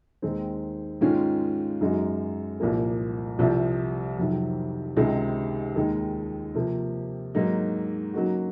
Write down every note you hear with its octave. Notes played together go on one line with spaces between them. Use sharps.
D#2 D#3 G#3 C4 D#4
G#2 D#3 G#3 C#4 F4
F#2 C#3 G#3 D#4 F#4
C2 A#2 F3 A#3
C2 C3 F3
F2 C3 D#3 F#3
C#2 C3 D#3 G#3 D#4
D#2 D#3 G#3 D#4
C3 F3 A#3
G#2 F#3 A#3 D#4
C#3 F#3 A#3 D#4 F#4